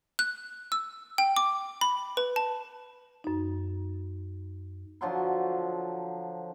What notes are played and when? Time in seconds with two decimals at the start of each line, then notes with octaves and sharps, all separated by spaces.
0.19 F#6
0.72 E6
1.18 G5
1.36 D6
1.81 B5
2.17 B4
2.36 A5
3.24 F#2 D#4
5.01 D3 F3 F#3 C6